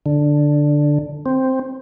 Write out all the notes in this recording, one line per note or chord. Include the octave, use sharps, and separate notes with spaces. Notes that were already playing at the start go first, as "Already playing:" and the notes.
D3
C4